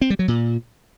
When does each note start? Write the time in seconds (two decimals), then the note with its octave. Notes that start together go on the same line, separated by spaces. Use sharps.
0.01 C4
0.10 G3
0.19 F#3
0.28 A#2